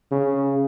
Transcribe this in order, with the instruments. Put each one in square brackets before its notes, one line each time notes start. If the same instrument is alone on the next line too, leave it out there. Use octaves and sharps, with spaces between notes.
[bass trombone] C#3